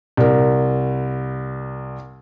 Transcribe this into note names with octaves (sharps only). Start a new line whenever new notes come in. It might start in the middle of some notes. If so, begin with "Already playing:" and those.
C2 A#4